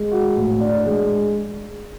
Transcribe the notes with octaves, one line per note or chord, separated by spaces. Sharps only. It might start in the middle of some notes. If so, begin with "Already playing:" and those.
Already playing: G#3
F#4
A2
D4
G#3